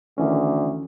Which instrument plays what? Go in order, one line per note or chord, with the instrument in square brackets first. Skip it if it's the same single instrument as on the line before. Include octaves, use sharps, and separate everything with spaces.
[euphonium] D2 [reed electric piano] D#3 E3 C#4